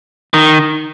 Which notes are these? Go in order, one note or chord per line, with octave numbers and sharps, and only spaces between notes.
D#3